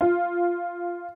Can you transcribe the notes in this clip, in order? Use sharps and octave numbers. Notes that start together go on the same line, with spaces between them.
F4